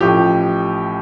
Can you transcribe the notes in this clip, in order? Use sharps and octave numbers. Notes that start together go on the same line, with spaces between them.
A1 A2 F3 G4